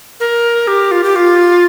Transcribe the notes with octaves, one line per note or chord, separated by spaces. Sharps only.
A#4
G4
F4
G4
F4